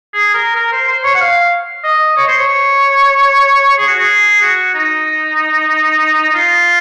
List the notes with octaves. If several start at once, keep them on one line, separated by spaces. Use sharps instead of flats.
G#4
A#4
A#4
C5
C5
C#5
F#5
F5
D#5
C#5
C5
C#5
G#4
F#4
G#4
F#4
D#4
D#4
F4